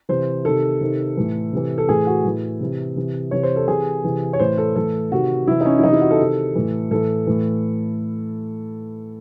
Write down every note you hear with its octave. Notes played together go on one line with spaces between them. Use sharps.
C3 E3 C5
C3 D#3 A4
C3 D#3
A2 E3
C3 E3
A4
A2 E3 G#4
F#4
A2 E3
C3 E3
C3 E3
C3 E3 C#5
C5
A4
C3 E3 G#4
C3 E3
C#5
A2 E3 C5
A4
A2 E3 A4
C3 D#3 F#4
C3 E3 E4
D#4
C#4
E4
C3 E3 D#4
E4
F#4
A4
C3 D#3
A2 E3
A2 E3 A4
A2 E3